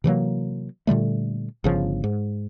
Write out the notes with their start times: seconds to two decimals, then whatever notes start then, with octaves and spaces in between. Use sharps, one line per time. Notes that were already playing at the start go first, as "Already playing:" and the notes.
0.04 C3 E3 F#3 A#3
0.87 A#2 D3 G3 A3
1.64 G1 C#3 F3
2.04 G#2